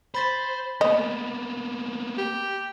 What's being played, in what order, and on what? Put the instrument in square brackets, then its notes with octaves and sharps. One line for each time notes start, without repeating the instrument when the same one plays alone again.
[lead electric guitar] C5 [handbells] B5 A6 B6
[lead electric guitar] A#3 B3 [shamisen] D#5
[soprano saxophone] G4